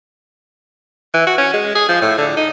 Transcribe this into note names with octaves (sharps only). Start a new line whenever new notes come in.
E3
F#4
C#4
G#3
G#4
F3
A2
D3
D#4